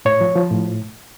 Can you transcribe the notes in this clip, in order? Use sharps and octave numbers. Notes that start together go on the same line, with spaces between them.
A2 C#5
F3
F3
A2